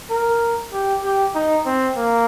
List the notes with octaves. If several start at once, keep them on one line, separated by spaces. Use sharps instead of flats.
A#4
G4
G4
D#4
C4
A#3